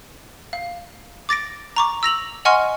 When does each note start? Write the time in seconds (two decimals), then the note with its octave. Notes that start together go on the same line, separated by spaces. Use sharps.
0.53 F5
1.29 D6 A6 A#6 D7
1.76 A#5 C#6 D6
2.03 E6 A#6 F7 F#7
2.45 D#5 F#5 G#5 C6 C#6 F6